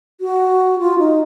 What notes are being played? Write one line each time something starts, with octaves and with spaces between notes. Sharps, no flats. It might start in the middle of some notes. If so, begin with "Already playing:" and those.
F#4
F4
D#4